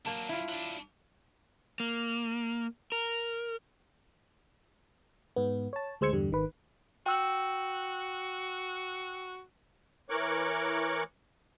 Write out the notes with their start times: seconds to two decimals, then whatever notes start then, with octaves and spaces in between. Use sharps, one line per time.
0.06 F#3 A#3 D4 A5
0.29 E4 F4
0.48 F#3 D4
1.80 A#3
2.92 A#4
5.36 G#2 B3
5.73 C#5 A5
6.01 D2 G#3 C5 E6 G#6 C#7
6.13 E2 G2 D3 G3
6.31 G#1 D#3 B4
7.06 F#4 G5 E6
10.10 E3 A#4 C#5 C#6 D6 F#6